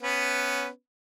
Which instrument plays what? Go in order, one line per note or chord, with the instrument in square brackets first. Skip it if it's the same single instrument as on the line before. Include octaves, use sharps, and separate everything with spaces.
[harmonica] B3 C#4 B4